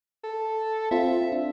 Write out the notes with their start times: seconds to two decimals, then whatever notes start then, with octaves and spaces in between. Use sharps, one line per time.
0.24 A4
0.91 C4 F4 E5
1.32 D4